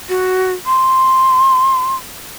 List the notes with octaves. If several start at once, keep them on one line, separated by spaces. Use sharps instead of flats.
F#4
C6